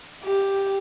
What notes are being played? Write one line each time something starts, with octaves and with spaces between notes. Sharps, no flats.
G4